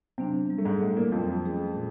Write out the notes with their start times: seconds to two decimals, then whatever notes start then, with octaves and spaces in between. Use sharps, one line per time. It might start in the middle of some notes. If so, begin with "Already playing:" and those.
0.18 C3 F#3 B3 C4 D4
0.50 G3
0.58 A3
0.65 G#2 G#3
0.81 A2 A3 B3 E4
0.97 A#2 A#3
1.12 F2 F3 F#3
1.44 A3 C#4 F4 G#4
1.75 A#2